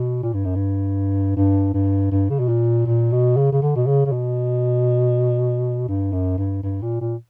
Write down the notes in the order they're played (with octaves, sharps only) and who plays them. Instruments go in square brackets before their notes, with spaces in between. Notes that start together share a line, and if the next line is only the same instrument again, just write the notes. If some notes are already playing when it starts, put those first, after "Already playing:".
Already playing: [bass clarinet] B2
A#2
G2
F#2
G2
G2
G2
G2
C#3
B2
A#2
A#2
B2
C#3
C#3
D3
B2
C#3
C#3
B2
G2
F#2
G2
G2
A#2
A#2